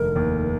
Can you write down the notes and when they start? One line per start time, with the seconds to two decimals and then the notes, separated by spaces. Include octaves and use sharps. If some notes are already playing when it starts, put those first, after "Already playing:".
Already playing: F1 D#2 D3 A#4
0.16 D#2